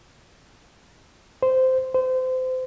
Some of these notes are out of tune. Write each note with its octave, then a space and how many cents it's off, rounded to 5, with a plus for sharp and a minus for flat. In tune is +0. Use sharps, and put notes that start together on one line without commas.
C5 -10
C5 -25